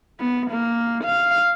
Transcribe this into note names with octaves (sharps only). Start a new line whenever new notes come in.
B3
A#3
F5